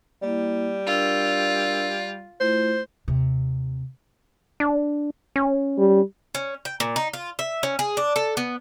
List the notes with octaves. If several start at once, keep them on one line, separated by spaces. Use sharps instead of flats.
G3 A#3 E4
D4 F4 A#4 E6
A3 E4 F4 C5
D#2 C3
D4
C#4
G3
C#4
G5
A#2
D#4
F4
E5
C#4
G#4
D4
A4
B3